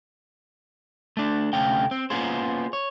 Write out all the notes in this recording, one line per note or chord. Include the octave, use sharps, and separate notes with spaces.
A3 D4
D2 C3 A3 C#4 F5 G5
C4
A#3 B3 C#4 F4 G#4 C5
C#5